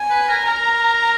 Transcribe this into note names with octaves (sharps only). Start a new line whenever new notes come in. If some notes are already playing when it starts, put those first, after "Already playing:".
Already playing: G#5
B4
A#4
A#4 A#5